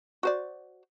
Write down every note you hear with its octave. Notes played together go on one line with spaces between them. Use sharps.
F#4 C5 D5